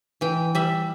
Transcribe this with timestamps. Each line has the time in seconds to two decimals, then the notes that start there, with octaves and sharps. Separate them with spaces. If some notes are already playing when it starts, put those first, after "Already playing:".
0.21 E3 G5
0.55 G3 E5